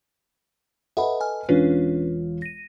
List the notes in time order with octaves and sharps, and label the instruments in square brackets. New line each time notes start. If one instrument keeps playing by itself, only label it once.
[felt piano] A4 B4 D#5 [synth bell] E5 F#5 B5
[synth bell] G#5 F6
[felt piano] E1 F4 C#5 [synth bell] C#4 D4 B4
[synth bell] A#6 D#7